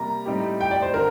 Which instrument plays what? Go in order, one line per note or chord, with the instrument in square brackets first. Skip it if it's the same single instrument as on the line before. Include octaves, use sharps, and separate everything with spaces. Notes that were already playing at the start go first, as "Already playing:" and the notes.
Already playing: [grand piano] C3 G3 A#3 [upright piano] A#5
[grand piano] A2 G3 C4 D#4 G4
[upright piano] G5
D5
C5
[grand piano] D3 [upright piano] A#4